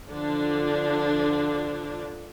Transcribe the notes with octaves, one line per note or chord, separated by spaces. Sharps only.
D3 F3 D4